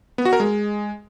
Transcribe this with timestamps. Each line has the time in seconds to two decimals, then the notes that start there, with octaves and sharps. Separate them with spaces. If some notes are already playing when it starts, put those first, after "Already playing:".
0.18 B3
0.25 F#4
0.33 A#4
0.40 G#3